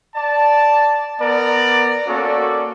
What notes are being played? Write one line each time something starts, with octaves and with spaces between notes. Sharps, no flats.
D5 A5
B3 A#4 D5
A#3 C#4 F#4 A4 D5